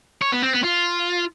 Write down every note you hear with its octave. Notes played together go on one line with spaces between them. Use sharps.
C#5
B3
C4
B3
F4